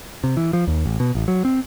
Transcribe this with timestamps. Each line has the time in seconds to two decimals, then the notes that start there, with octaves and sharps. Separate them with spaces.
0.24 C3
0.37 E3
0.53 F3
0.67 D#2
0.86 A1
1.00 B2
1.15 A1
1.28 F#3
1.45 C4